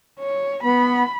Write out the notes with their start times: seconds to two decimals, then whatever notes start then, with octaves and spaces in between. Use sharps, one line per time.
0.19 C#5
0.64 B3 B5